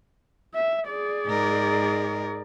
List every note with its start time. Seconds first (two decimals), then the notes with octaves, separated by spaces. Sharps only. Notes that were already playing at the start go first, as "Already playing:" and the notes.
0.55 E5
0.88 G#4 D5
1.26 G#2 A#4